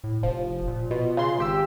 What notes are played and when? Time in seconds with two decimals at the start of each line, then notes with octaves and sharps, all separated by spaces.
0.04 A2
0.23 F1 F3
0.67 A#2
0.91 B2 F4
1.17 C#3 C6
1.39 G#1 G4 E6